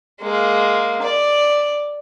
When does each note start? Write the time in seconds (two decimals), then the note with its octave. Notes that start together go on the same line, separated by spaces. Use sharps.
0.21 G#3 A#3
1.02 D5